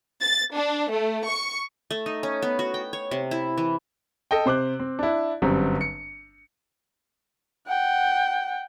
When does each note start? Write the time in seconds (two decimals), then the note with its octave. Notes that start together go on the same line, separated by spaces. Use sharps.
0.22 A6
0.56 D4
0.93 A3
1.29 C#6
1.91 A3
2.06 D#4
2.23 C#4
2.42 B3
2.59 F#4
2.74 G5
2.93 C#5
3.11 C3
3.31 E4
3.58 E3
4.31 A4 D#5 G5
4.46 C3 C5 D6 F#6
4.80 C4
4.99 D4 E4
5.42 G1 F#2 F#3 G3 C4
5.81 C#7
7.67 F#5 G5